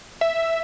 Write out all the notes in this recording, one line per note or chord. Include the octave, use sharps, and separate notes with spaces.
E5